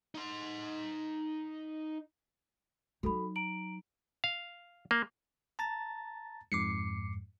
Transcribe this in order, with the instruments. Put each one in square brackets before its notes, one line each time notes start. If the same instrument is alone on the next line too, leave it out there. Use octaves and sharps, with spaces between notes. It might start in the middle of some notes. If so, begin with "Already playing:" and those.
[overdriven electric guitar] D#4 C6
[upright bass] F#3 D#4 [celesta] F#4 A4 B5
[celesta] A#5 D7 F#7
[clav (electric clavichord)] F5
A#3
[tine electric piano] A5 A#5 A6
[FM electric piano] F2 G#2 [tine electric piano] D6 C7 C#7